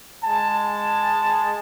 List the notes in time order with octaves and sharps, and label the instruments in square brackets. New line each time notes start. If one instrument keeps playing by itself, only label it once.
[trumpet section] G#3 G#5 A5